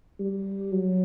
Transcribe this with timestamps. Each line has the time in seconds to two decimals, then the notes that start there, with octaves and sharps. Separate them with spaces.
0.19 G3
0.72 F#3